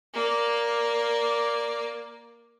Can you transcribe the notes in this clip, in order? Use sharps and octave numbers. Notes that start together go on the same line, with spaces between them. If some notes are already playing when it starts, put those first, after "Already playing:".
A#3 D5